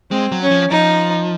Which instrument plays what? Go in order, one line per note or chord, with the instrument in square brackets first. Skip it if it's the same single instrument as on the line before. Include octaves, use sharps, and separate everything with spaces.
[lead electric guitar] G#3 [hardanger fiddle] C4
[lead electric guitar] F#3
[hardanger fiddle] C#4
[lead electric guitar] F3
[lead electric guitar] F3 [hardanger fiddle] D#4